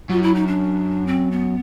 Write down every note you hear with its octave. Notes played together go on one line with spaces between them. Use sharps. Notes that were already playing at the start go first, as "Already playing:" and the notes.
F#2 F4
E4
D#4
D4
C4
B3